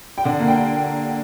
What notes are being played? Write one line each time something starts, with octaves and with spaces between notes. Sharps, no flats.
G5
D3 F#5
A#3
G5